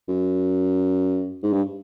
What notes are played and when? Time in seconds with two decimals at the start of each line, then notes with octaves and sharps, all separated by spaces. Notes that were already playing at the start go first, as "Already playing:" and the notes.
0.08 F#2
1.43 G#2
1.53 G2